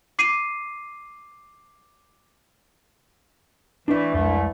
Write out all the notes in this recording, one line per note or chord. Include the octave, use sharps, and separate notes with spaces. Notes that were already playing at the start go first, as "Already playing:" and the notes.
D6 C7 D#7
E3 A3 D4 E4 B4 D5 E5
C2 F2 G#3 A3